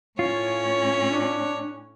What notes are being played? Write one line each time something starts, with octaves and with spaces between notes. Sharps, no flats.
A2 C#4 F4 C#5
D4